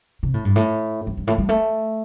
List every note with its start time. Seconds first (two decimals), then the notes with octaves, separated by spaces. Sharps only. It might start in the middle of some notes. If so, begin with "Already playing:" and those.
0.23 C3
0.34 A2
0.45 G2
0.56 A2
1.07 G2
1.17 G2
1.27 A2
1.38 G3
1.49 A3